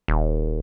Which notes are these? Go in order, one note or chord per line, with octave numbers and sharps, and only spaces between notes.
D#1